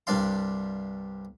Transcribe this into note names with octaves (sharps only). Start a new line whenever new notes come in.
C2 G2 D4 D5 F5 C6